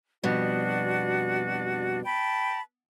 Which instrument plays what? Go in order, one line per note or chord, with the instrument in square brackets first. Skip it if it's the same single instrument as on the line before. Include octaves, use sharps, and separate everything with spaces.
[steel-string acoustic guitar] F2 B2 G3 [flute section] D4 F#4
[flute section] G5 A5 B5